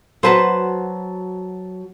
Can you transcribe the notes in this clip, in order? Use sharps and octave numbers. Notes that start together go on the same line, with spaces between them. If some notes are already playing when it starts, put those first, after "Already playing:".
F#3 F#4 B4 C5 A5